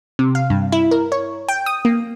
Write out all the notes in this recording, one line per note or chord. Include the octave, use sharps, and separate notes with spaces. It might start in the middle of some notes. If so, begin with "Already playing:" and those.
C3
F5
G2
E4
A#4
C#5
G5
D#6
A#3